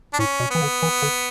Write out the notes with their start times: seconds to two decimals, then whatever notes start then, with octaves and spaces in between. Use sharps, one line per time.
0.13 D4
0.19 A2 C#4
0.40 B2
0.50 E3 B3
0.61 D3
0.82 E3
1.02 D3